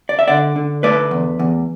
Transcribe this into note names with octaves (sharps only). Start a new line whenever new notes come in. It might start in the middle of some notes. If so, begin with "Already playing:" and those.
D5
E5
D3 D5 F#5
D3
A3 B4 D5
E2
E2